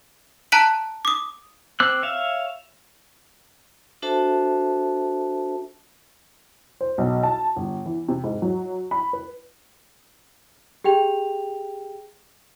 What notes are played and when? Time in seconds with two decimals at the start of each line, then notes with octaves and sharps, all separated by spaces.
0.52 A5 A#5 F#6 B6 D7 F#7
1.05 D6 D#6
1.80 C4 D6 E6 F#6
2.02 C#5 E5 F5
4.02 D4 F#4 A4 C5 E5 A5
6.81 C5
6.98 B1
7.23 A5
7.56 G1
7.86 E3
8.09 C3
8.24 G#2
8.42 F#3
8.91 B5
9.13 B4
10.84 G4 G#4 G5 F7